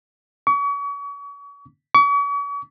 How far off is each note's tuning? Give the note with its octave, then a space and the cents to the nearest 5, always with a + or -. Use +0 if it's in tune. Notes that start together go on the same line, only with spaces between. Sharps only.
C#6 +40
C#6 +45